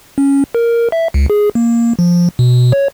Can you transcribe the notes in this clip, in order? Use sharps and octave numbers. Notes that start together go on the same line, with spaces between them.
C#4
A#4
E5
C#2
G#4
A#3
F3
B2
C#5